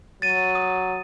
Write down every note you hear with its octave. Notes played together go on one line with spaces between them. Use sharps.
F#3 A6 D#7
D#6